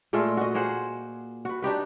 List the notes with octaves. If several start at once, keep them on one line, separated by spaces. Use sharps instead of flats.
A#2 G#3 A3 F4
F#4 D#5
A#3 G#4 C5 F#5
F#4 B4
D4 D#4 G4 B4